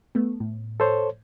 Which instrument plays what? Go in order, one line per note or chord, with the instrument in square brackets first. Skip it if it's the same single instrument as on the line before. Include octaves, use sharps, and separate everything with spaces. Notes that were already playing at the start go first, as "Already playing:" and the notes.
[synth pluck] A3 B3
A2
[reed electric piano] A4 C5 C#5